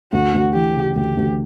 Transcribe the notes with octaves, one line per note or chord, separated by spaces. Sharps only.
D2 F#4
D2
E3 G4
C#3
D2 G4
D2